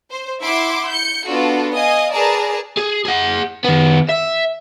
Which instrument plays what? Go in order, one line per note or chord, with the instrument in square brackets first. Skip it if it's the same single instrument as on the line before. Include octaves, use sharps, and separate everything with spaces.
[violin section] C5
E4 E5 F#5 C6 D6
G6 C#7
B3 D4 F4 F#4 A4
D#5 F5 G#5 D#6
G#4 A#4 B4 D5 A5 A#5
[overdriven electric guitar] G#4
G#4 F#5
D#3 B3
E5